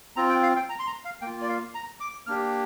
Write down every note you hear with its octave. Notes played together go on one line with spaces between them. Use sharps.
C4 F4 A#5
G5
F5
G5
A#5
C6
A#5
F5
A#3 G5
F4
D5
F5
A#5
D6
A#3 D4 G4 F6